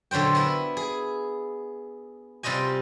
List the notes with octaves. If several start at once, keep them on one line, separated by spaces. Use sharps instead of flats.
A#2 D3 F#3 C5 G5
B3 E4
G#4
C3 G3 F4 D#5 G#5